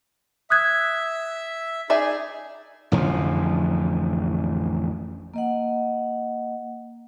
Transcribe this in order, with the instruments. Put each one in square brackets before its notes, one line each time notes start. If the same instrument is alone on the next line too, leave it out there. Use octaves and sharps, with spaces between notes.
[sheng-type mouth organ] E5 [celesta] D#6 F#6 G#6
[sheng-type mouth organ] D#4 G#4 [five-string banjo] D5 E5 G#5
[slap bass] A1 F2 D3 F3
[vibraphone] A#3 D#5 F#5